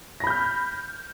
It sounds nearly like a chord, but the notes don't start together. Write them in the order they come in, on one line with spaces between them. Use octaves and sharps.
A#6 B5 G6 F6